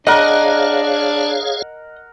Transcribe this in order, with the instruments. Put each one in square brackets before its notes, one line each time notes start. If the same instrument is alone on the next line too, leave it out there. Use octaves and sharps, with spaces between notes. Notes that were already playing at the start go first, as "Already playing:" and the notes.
[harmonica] D4 [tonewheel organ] G#4 C#5 F5 [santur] A#4 F#5 [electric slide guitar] D#5